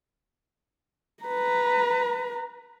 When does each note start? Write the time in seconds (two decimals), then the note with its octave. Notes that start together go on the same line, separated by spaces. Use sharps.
1.24 B4 A#5